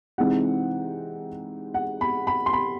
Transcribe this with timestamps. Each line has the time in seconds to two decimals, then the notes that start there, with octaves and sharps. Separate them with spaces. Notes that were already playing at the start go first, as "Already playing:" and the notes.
0.18 C3 E3 G#3 C4 D#4 F#5
1.74 F#5
2.01 B5
2.27 B5
2.46 C6
2.53 B5